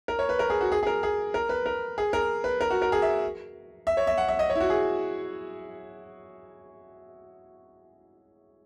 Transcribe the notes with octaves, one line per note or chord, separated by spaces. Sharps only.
A#4
C#5
B4
A#4
G#4
F#4
G#4
G#4
A#4
G#4
A#4
B4
A#4
G#4
A#4
B4
A#4
F#4
A#4
G#4
E5
E5
C#5
E5
F#5
E5
D#5
C#5
E4
F#4
G#4